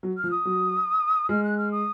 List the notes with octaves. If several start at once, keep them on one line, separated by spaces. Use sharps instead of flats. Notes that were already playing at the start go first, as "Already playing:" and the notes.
F#3
F6
F3
D#6
F#3
G#3 F6
F#6
F6
D#6